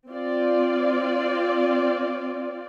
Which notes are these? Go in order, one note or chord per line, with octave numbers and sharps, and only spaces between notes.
C4 F4 D5